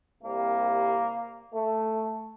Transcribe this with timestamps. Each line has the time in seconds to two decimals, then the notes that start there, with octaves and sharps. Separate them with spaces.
0.22 C2 C3 G3 A#3
1.54 A3